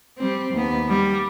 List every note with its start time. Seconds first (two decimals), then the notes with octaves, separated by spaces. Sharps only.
0.18 G3 C4
0.54 D#2 B3
0.88 G3